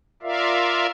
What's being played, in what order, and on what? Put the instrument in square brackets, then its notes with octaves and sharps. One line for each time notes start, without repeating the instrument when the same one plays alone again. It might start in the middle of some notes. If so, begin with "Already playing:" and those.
[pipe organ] F4 A#4 D5 E5 F5